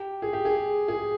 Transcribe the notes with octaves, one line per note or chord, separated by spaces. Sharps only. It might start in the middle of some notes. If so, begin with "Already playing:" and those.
Already playing: G4
G#4
G4
G#4
G#4